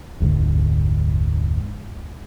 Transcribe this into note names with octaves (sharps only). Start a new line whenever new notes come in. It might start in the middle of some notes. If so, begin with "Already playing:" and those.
F1 D2 G#2 D3